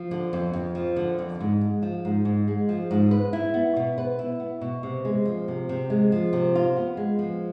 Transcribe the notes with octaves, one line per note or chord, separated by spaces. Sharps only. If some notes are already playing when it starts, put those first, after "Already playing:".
Already playing: F3
D3
F2
F2
F3
D3
F2
G#2
G#3
F3
G#2
G#2
G#3
F3
G#2
B4
E4
B3
B2
B4
E4
B3
B2
C3
G#3
F3
C3
C3
G#3
F3
C3
F4
B3
G#3
F3